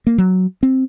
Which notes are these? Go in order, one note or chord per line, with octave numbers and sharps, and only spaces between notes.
A#3
F#3
C4